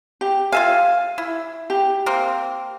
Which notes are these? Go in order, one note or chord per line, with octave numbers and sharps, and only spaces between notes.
G4
F4 E5 F5 G#5
E4
G4
A#3 C4